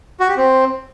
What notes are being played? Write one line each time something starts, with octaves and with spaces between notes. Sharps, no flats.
F#4
G4
C4